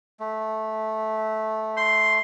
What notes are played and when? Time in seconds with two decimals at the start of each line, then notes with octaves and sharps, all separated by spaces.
0.20 A3
1.77 C6